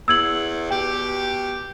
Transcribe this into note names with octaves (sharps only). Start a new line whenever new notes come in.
E2 E6 G#6 F#7
B2 G4 G5